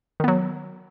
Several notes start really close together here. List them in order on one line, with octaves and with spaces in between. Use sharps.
D#3 B3 F#3